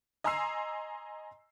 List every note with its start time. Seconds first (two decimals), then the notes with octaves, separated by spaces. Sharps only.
0.24 D#5 G#5 A#5 C6 E6 C7